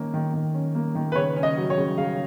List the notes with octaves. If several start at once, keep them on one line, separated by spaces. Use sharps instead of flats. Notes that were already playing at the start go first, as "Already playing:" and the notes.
Already playing: D#3 A#3 C#4
D#3
D#3
C#4
A#3
D#3
B4
C#3 C#5
C#4
D#5
F#3
C#5
C#3
C#3 F5